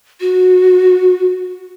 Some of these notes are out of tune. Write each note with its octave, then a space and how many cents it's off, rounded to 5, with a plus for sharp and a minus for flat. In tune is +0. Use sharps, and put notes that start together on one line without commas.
F#4 -15